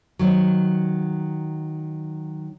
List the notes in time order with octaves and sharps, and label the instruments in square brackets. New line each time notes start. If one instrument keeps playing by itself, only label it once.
[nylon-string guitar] D#3 F#3